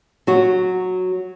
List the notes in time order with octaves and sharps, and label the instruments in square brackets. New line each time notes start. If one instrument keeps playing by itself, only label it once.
[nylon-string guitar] F#3 F#4